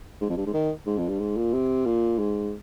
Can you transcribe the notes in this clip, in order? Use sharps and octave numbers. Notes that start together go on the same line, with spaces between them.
G#2
F2
G2
G#2
D#3
G#2
F2
G2
G#2
A#2
C3
A#2
G#2